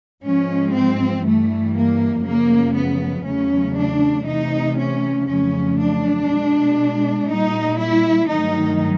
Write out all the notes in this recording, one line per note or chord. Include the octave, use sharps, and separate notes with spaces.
G#2 F3 G#3 C#4
C4
G2 E3 G3 A3
A#3
F#2 C#3 F3 A3 A#3
B3
E2 C#3 F#3 A3 C#4
D4
C3 E3 A3 D#4
C#4
F2 C#3 F#3 A3 C#4
D4
B2 G#3
A#2 G3 D#4
E4
G2 D#3 F#3 A3 D#4